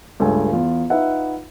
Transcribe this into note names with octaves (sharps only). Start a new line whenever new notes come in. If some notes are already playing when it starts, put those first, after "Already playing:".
C#2 G2 A3 G#5
E2 F4
D#4 F4 B4 E5 F#5